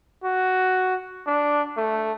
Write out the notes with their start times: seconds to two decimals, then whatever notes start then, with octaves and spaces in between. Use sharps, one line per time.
0.24 F#4
1.27 D4
1.77 A3